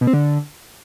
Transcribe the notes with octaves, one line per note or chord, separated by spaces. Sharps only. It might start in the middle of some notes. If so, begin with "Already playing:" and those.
B2
C4
D3